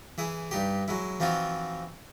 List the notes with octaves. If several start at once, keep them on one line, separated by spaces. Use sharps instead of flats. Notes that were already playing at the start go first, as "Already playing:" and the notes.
E3 E4 G#4
G2 D#4 G4
F#3 G#3 E4
E3 F3 C4 D#4 F4 F#4